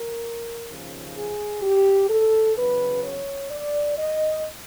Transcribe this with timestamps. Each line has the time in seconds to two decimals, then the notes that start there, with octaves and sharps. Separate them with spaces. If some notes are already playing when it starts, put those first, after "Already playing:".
Already playing: A#4
0.69 D#2 C#3 F3
1.16 G#4
1.62 G4
2.09 A4
2.56 E2 C#3 F#3 B4
3.03 C#5
3.51 D5
3.97 D#5